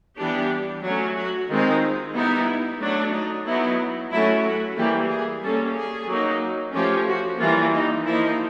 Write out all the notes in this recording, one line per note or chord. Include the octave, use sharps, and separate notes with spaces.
E3 G3 B3 D4 G4
F#3 A3 C#4
F#4
D#3 G#3 C4 D#4 F4
G3 B3 D#4 E4
F#3 A3 D4
D#4
F#3 B3 D#4 E4
F#3 A3 C#4 E4
F#4
E3 G3 A#3 G4
G#4
G3 A#3 C#4 A4
G#4
F#3 A#3 D#4
F3 A3 C#4 G4
F#4
E3 G3 A#3 F4
D#4
F3 A#3 D#4 E4